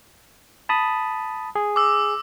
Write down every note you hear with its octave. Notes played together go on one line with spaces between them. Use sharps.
A5 B5 D#6
G#4
D6 E6